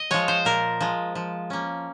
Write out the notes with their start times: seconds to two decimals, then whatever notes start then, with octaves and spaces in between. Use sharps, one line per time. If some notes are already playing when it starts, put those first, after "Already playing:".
Already playing: D#5
0.11 F3 G#3 C#5
0.28 C5
0.45 A#2 A#4
0.81 F3 G#3
1.15 F3
1.50 A#3 C#4